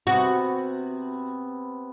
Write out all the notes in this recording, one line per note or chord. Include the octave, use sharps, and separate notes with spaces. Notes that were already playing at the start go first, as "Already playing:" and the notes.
C3 B3 F#4